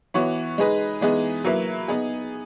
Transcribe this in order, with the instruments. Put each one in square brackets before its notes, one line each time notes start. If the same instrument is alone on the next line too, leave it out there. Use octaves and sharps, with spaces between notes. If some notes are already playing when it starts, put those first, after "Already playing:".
[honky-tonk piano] E3 B3 F#4 C#5
G#3 D#4 G#4 B4
E3 G#3 B3 D#4 G#4
F#3 A#3 E4 B4
B3 D#4 G#4